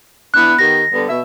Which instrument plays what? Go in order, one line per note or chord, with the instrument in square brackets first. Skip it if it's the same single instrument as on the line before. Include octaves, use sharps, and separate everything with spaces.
[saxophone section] B3 D4 E4 [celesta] F#6
[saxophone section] D#3 B3 G4 [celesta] A#6
[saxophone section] D3 G3 B3
B2 E5